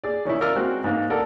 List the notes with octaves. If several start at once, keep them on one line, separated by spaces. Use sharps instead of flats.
G#4 D5
D#3 C#4 D#4 E4
F4 A#4 D5 E6 F6
G#3 C4 F#4 G#4
G#2 A#3
A4 A#4 D5 F#5